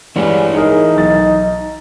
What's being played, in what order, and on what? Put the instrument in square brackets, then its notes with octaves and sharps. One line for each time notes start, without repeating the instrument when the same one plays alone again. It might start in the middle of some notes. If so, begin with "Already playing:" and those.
[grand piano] G2 G3 G#3 [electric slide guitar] E3 E4 C#5
[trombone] D#4 [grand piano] G#4 A#4
[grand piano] B1 A6